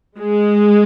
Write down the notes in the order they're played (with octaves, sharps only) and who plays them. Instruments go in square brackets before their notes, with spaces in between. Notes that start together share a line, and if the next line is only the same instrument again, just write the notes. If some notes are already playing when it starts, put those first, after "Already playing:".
[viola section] G#3